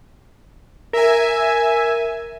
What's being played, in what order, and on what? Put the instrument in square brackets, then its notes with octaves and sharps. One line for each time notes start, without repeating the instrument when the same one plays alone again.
[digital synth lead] A#4 [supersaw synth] E5 G#5